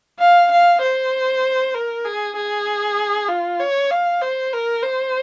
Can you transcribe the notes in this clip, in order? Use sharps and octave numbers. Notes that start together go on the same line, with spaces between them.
F5
F5
C5
A#4
G#4
G#4
F4
C#5
F5
C5
A#4
C5